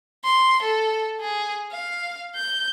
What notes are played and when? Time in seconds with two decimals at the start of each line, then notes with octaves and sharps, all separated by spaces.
0.24 C6
0.63 A4
1.21 G#4
1.72 F5
2.36 G6